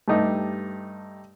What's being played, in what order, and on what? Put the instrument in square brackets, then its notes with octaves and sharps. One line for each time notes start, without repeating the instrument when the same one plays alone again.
[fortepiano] G2 A3 D#4 G4